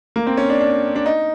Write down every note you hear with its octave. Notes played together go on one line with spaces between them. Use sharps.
A#3
C4
C#4
D4
D4
D4
D#4